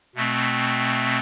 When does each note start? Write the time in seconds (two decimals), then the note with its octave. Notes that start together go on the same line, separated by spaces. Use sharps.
0.15 B2 A3 C4